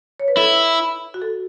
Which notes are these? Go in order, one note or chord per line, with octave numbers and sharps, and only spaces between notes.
C#5
B4
E4 A4
F#4
A4